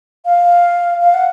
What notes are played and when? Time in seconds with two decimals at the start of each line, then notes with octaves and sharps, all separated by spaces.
0.25 F5
1.01 F5
1.14 F#5